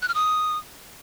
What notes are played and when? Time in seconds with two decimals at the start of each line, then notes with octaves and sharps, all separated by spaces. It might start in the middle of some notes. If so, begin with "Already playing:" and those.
0.02 F#6
0.08 F6
0.14 D#6